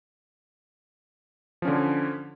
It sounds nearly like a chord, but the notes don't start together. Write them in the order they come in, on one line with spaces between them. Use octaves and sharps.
F3 C#4 D3